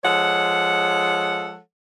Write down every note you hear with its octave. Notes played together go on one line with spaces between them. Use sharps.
F3 G#3 A4 C#5 F#5